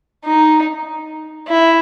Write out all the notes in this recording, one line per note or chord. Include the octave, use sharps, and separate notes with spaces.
D#4
E4